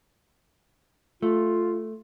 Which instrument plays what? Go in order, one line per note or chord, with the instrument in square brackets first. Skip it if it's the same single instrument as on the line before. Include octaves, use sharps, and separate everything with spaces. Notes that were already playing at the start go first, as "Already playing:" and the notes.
[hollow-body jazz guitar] A3 [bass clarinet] F4